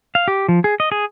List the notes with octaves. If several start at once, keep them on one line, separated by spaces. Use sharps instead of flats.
F5
G4
F3
G#4
D#5
G#4